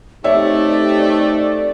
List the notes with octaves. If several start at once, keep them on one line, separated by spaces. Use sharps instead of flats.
A3 C4 D#4 G4 C#5 D5 E5